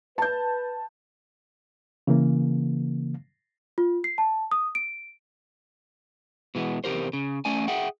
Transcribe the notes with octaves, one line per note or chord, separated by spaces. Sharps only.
B4 A5 G6
C#3 E3 A#3
F4
C7
A5
D#6
D7
B2 E3 G#3 A#3 B3
E2 C3 F3 G4 A#4 C5
C#3
A3 C#4 D5 G#5
G#4 E5 F#5 G5